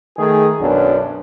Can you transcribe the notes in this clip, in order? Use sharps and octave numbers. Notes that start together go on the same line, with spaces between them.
D#3 A3 G#4
B1 F#2 F#3 D4